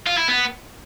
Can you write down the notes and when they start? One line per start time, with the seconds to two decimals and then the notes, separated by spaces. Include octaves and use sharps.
0.06 F4
0.17 E4
0.28 B3